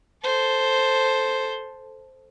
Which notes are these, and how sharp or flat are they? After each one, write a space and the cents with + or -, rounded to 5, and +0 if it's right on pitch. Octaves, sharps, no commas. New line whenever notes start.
A4 +0 C5 +0